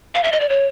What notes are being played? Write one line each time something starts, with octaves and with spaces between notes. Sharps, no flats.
F5
E5
D#5
D5
C#5